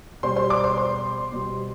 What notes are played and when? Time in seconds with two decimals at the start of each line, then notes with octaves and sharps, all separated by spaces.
0.23 B2 G3 C5 C6
0.36 C5 C6
0.50 D5 D6
0.64 C5 C6
0.77 C5 C6
1.32 B2 G3